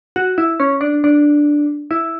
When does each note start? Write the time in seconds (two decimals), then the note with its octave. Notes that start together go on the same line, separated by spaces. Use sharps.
0.16 F#4
0.38 E4
0.60 C#4
0.81 D4
1.04 D4
1.91 E4